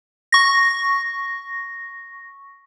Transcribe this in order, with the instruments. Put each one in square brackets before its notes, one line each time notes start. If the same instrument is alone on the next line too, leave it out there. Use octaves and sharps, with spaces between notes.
[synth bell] C#6 A#6